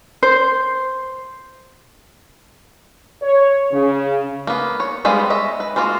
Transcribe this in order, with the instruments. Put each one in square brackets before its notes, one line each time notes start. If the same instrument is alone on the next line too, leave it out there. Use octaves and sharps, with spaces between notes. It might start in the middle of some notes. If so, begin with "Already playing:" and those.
[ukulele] C5
[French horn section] C#5
C#3
[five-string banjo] A#3 B3
C#5
G3 G#3 B3 C4 F5
C#5 D#5 E5
B4
G#3 A#3 F4 F#4